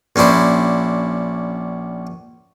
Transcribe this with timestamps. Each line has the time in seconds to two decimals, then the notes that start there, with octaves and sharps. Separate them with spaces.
0.16 A#1 C#4 D4 E4 C5